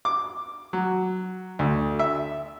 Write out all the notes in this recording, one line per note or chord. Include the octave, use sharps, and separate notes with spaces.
D6
F#3
D2
E5